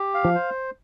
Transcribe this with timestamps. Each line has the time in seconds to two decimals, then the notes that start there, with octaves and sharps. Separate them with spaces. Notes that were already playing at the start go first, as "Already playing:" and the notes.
Already playing: G4
0.14 F5
0.25 F3
0.35 C5